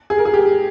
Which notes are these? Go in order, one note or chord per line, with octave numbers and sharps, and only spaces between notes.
G#4
A#4
G#4
G4